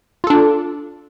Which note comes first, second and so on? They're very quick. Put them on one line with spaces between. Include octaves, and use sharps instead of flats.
F4 A4 D4